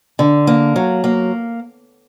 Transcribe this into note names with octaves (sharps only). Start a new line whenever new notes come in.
D3
A#3
F#3
A#3